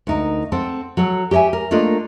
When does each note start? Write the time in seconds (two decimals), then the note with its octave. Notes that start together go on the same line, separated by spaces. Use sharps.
0.07 D2 D#4 A#4
0.52 C4 A4 C5 F#5
0.97 F#3 A4 C#5
1.31 G4 C#5 D#5 E5 G#5
1.53 A#4
1.71 A3 A#3 D4 F4 A#4 D#5